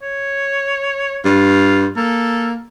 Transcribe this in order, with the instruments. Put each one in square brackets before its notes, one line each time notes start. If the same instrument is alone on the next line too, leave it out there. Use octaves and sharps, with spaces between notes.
[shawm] C#5
[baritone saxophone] G2 [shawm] F4
[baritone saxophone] A#3 [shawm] A4